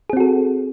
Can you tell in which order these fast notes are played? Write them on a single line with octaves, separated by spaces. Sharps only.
G#4 C4 F#4 A4